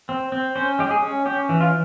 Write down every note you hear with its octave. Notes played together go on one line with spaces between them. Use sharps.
C4
C4
C#4 C5
G#3 G4
G#4
C#4
C#4 G4
E3
F4